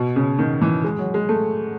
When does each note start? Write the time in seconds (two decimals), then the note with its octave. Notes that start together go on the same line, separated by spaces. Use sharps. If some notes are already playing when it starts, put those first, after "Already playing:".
Already playing: B2
0.16 C#3
0.39 D#3
0.62 E3
0.84 G#3
0.98 F#3
1.14 G#3
1.29 A3